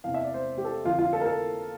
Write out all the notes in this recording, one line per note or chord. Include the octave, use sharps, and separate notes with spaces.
E2 C3 E3 F5
E5
D5
C5
G4
A4
F2 D3 F3 F4
F4
A4
A#4
A4